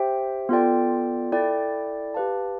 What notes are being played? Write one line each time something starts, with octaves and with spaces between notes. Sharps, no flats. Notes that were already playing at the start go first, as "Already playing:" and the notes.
Already playing: G4 C5 E5 G5
B3 F4 A4 D5 G5
E4 A4 D5 G5
G4 B4 F5 A5